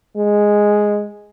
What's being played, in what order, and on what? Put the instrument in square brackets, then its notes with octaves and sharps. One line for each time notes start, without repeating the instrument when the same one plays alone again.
[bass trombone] G#3